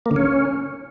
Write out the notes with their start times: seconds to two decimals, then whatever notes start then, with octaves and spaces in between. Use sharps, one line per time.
0.06 A#3
0.11 D3
0.16 C#4